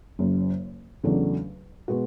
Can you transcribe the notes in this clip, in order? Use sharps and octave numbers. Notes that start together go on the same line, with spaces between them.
F#1 F#2 C#3
E2 C#3 F#3 A3 D4
B2 G#3 B3 F#4